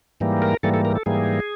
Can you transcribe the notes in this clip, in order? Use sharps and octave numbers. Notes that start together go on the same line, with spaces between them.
G#2 E3 G3 A#3
A#4
G#2 E3 G3 A#3 A4
A4
A#4
A4
G#2 E3 G3 A#3 G#4